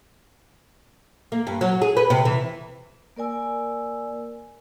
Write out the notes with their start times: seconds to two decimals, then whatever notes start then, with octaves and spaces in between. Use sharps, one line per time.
1.32 A#3
1.47 G2
1.61 F#3
1.82 G#4
1.97 B4
2.10 C3
2.25 E3
3.16 A#3 A#4 D5 G#5 E6